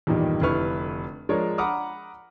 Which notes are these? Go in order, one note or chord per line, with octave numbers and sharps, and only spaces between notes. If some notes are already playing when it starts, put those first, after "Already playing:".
E2 G2 A#2 D#3 G3 D#4
F1 D3 E4 B4 C#6 F6
F3 G#3 D4 A#4 C#5 D5
F#5 A#5 B5 D6 D#6 F6